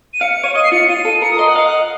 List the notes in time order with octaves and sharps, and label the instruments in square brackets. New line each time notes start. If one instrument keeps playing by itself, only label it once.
[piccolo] D#7
[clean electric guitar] F5 [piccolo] C#7
[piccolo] C#7
[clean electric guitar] C#5 [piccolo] D#7
[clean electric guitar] D#5 [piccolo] D#7
[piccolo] C7
[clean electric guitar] F4 [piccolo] C#7
[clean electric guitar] F4 [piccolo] D#7
[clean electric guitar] A4
[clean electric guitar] A#4 [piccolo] C#7
[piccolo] D#6
[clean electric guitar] D#5 [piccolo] C6
[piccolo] F#5
[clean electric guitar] D#5 [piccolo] F5
[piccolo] F#5